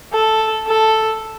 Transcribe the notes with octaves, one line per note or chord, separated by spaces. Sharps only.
A4
A4